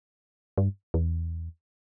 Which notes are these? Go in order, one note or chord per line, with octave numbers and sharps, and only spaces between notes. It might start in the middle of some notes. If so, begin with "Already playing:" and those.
G2
E2